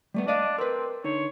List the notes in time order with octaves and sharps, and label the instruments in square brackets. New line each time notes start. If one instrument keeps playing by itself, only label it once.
[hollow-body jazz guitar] G3 A3 B3
[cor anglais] D4 [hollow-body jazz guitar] D5 D#5 F5
[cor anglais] C4 [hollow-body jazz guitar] A#4 B4
[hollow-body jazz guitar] D3 D#4 [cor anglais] C#5